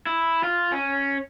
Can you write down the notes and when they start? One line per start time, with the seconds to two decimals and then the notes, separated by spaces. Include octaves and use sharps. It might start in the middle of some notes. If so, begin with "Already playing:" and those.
0.06 E4
0.43 F4
0.72 C#4